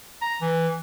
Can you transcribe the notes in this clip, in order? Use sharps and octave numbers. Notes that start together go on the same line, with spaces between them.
A#5
E3